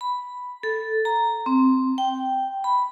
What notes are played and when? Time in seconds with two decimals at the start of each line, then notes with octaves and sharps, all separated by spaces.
0.01 B5
0.63 A4
1.05 A#5
1.46 C4
1.98 G5
2.64 B5